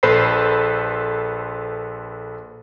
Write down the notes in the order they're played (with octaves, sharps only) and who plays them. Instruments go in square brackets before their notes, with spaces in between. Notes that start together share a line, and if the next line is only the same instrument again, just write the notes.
[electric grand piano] A#1 A4 B4 C5 B5 C7